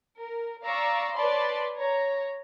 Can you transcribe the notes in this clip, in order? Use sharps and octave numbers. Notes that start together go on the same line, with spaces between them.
A#4
D5 F5 A#5 C#6 E6
B4 C#5 D5 A5 B5 C6
C#5 A#5